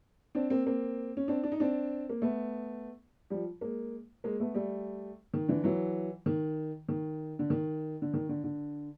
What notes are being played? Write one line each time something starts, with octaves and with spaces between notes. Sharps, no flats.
C4 D4
A#3 C4
A#3 C4
C#4
C4 D4
D4
D#4
C4 D4
A#3
A3 B3
F3 G3
G#3 A#3
G#3 A#3
A3 B3
G3 A3
D#3
D3 E3
E3 F#3
D#3
D#3
D3
D#3
D3
D#3
D3
D3